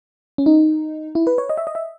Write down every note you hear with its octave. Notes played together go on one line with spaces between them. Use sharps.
C#4
D#4
E4
B4
C#5
D#5
E5
D#5
E5